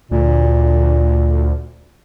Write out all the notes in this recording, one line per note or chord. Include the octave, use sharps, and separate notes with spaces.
D2 A#2